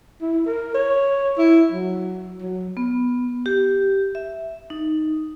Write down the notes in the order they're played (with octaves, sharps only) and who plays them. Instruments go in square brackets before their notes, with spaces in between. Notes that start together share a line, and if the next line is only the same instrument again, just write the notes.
[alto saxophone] E4
A#4
C#5
E4
F#3
F#3
[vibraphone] B3
G4
E5
D#4